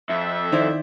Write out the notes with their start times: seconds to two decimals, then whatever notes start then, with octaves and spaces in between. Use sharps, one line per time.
0.09 F2 E5
0.52 D#3 D#4 E4 C5 D5